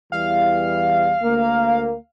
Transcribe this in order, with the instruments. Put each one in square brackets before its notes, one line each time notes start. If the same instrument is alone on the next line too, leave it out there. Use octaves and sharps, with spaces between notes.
[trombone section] E2 E3 G3 [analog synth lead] F5
[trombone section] D2 A#3